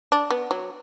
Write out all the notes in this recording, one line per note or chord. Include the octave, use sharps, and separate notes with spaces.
D4
B3
F#3